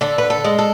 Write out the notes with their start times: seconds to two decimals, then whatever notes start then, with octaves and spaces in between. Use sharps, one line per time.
0.01 D3 A4
0.18 B4
0.30 A4
0.44 G#3
0.58 A4